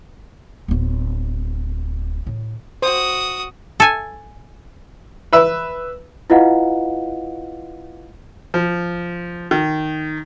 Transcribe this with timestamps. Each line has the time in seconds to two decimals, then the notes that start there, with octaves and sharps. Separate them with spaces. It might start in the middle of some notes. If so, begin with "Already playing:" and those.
0.68 D1 B3
2.26 A2
2.82 F#4 C5 D#6
3.80 A4 G#5
5.33 B4 E5
6.30 E4 F4 B4 D#5 F5 F#5
8.54 F3
9.51 D#3